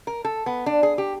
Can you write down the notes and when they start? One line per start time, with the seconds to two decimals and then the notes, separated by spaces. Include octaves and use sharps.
0.07 A#4
0.25 A4
0.46 B3
0.66 D4
0.83 G#4
0.98 G4